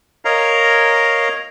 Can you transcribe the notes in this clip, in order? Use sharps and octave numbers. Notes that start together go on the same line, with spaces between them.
A#4 C#5 D#5 F5 A#5